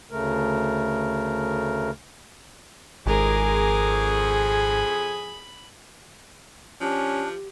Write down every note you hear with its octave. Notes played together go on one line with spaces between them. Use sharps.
D2 C#3 A3 A#4
G#1 F2 G#3 G#4 A#4 D6
B5
F3 C#4 D4 G4